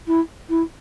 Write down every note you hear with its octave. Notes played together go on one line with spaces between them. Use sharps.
E4
E4